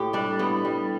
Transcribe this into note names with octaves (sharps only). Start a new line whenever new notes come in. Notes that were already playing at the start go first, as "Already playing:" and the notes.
Already playing: A2 G4
G3 D4
A2 B3
G3